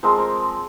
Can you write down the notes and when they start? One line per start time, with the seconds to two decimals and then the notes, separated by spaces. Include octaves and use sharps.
0.03 F3 G#3 C4 A#4 C5
0.18 A#4 C5